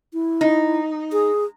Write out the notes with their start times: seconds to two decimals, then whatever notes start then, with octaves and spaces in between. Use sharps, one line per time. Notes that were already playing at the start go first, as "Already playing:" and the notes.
0.13 E4
0.41 D#4
1.12 G#4